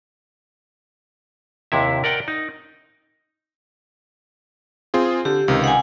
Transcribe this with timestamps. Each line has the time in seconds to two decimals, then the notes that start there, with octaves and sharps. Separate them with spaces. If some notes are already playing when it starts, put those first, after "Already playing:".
1.72 D#2 C3 E4 E5
2.04 A#4 D5 F#5 G5
2.28 D#4
4.94 C4 F4 G#4
5.25 D3 G4
5.48 C#2 C3 D#3
5.64 F#5 G#5